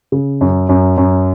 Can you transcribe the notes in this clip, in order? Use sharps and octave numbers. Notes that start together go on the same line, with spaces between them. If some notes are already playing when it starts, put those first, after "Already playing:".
C#3
F#2
F#2
F#2